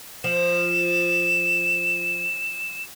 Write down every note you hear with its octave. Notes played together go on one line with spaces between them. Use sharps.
F3 E7